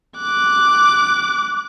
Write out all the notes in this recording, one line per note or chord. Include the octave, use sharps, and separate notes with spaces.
D6 F#6